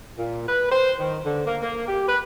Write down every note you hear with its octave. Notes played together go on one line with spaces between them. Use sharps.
A#2
B4
C5
D#3
D3
A#3
A#3
G4
B4